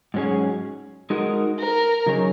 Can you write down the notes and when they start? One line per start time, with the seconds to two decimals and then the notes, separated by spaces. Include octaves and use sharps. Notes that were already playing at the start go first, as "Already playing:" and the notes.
0.14 G#2 F#3 C#4 G#4 C#5
1.10 G#3 D#4 F#4 A#4
1.59 A#4
2.06 C#3 F#3 D#4 G#4 C#5